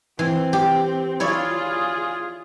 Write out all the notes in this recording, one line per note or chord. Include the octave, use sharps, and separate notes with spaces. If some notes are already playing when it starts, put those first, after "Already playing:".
E3 C4
G4
E4 F4 G#4 C#5 D5